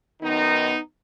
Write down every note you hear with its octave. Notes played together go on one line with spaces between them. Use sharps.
F#2 D#3 B3 D#4